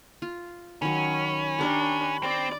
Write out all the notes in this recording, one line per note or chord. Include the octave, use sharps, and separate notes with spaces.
F4
D#3 F#3 C#4 B5
D4 G4 A#4 C#5
C4 D5